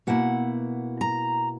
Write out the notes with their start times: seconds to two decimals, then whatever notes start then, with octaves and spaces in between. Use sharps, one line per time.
0.07 B2 A#3 E4 F#5
1.01 A#5